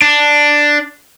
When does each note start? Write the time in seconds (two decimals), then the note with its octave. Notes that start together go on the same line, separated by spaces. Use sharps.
0.02 D4